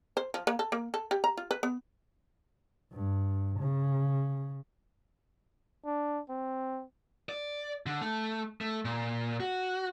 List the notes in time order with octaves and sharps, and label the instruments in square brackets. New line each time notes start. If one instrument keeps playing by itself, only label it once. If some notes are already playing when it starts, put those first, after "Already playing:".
[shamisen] C5
F3
A#3
A4
A#3
A4
G4
A#5
F4
B4
B3
[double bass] G2
C#3
[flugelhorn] D4
C4
[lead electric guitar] D5
D3
A3
A3
A#2
F#4